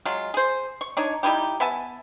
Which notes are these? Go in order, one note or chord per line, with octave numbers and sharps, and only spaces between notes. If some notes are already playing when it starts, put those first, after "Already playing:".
F#3 G#3 F4
G#4 C5
C#6
D4 D#4 C#5
G3 D#4 E4 G4
B3 E5 G#5 A5